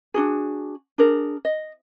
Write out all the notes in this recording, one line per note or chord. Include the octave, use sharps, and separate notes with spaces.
D4 F#4 G#4
D4 G#4 A#4
D#5